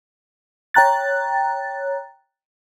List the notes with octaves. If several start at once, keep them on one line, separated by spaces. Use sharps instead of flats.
C#5 G5 A#5 F#6 A6